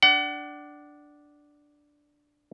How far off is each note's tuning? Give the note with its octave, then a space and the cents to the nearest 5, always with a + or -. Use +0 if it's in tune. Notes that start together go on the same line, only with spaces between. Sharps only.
D4 +0 F#5 +35